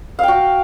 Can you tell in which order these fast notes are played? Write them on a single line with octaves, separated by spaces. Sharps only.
F5 G5 F#4